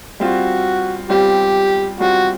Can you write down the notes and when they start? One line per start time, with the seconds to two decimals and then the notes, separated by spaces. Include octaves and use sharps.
0.20 G3 C4 F4 F#4
1.10 G3 C4 F4 G4
2.00 G3 C4 F4 F#4